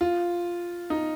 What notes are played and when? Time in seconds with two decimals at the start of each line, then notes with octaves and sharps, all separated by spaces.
0.01 F4
0.90 D#4